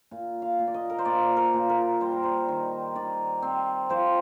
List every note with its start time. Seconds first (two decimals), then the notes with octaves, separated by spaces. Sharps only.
0.11 A#2 F5
0.42 F5
0.59 A#2
0.67 D5
0.74 D#5
0.90 A#4
0.99 C5
1.05 A#2 D5
1.37 A#4
1.54 A#2
1.69 A#4
2.01 G3 C5
2.12 A#4
2.23 C5
2.48 D#3
2.95 D#3 D5
3.42 C4
3.89 F3 C5